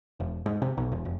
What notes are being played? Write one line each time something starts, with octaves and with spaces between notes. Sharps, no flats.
E1
G#2
C3
B1
E1
F1